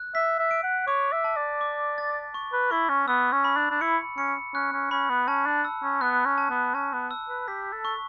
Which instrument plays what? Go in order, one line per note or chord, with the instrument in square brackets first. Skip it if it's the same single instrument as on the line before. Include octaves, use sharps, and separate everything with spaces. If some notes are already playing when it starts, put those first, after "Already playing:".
Already playing: [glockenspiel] F#6
[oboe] E5 [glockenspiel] B6
[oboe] E5
[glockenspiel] D7
[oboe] F#5
[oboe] C#5 [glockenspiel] D6
[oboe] E5
[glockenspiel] A5
[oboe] D5
[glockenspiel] D6
A6
C#6
[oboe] B4
[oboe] E4 [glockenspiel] C#6
[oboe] C#4
[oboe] B3 [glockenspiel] E6
[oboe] C#4
[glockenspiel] B5
[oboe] D4
D4
[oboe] E4 [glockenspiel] C#7
[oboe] C#4 [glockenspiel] C#7
[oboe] C#4 [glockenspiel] F#6
[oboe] C#4
[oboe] C#4 [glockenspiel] B5
[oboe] B3
[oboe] C#4 [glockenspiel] A5
[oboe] D4
[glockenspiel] E6
[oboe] C#4
[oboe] B3 [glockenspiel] F#6
[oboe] C#4
[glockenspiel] A5
[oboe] B3
[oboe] C#4 [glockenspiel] A5
[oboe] B3
[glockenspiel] E6
[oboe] B4
[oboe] G4 [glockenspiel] B6
[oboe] A4
[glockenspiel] C#6